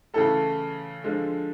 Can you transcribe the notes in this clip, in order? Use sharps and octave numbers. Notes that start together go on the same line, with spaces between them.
C#3 E3 A3 A4
D3 F3 G#3